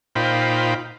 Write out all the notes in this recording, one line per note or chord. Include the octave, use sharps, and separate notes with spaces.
A#2 D#4 F4 C5 G5 B5